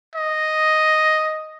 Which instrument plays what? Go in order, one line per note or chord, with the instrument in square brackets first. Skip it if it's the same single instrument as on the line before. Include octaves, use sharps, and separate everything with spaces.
[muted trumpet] D#5